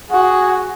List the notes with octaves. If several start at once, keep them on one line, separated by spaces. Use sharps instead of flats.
F#4 G#4